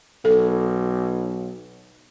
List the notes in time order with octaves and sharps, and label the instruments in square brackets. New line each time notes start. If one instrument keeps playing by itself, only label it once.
[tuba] B1 [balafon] A4